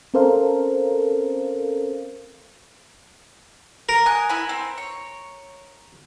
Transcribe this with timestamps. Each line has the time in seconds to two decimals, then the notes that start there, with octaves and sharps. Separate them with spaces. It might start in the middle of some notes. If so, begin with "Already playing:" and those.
0.14 C4 C#4 A4 A#4 C5 F5
3.89 A#4
4.06 G#5 D#6 F#6
4.29 E4 G#5 B5
4.49 C4
4.78 C#5